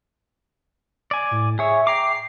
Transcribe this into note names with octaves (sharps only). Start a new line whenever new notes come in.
D5 G#5
A2
G#4 C#5 E5
G5 A#5 D6 C7